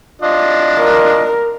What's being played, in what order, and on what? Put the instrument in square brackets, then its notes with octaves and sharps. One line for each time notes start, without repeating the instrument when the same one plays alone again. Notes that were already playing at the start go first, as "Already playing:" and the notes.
[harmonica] D4 F4 D#5
[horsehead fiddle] A#4